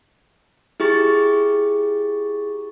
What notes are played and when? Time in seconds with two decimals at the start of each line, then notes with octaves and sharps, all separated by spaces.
0.80 E4 G4 G#4 C#6 A6